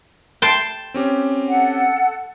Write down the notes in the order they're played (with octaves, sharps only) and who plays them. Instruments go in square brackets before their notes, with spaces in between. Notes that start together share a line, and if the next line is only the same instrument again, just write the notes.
[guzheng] G5 A5 C6
[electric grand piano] C4 C#4 G4
[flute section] A4 F#5